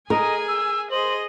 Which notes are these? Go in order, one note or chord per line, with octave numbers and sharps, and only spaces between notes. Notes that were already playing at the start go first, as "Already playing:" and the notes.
G#4 A#4 D#5 G#5
E6
G#4 C5 D#5 F#7